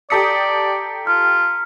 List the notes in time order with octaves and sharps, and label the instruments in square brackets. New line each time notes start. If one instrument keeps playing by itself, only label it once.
[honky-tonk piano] G4 A4 D#6 [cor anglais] D5 [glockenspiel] A#5 B6 C#7
[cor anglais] F4 [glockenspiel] F6